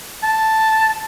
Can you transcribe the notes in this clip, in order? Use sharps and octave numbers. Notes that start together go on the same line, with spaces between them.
A5